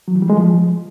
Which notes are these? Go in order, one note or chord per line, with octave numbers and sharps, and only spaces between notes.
F#3
E3
G3
G#3
F3